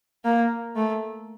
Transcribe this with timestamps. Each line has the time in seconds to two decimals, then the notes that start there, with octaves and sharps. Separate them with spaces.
0.25 A#3
0.76 A3